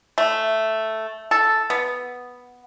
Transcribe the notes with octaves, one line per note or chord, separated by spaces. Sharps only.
A3
A4
B3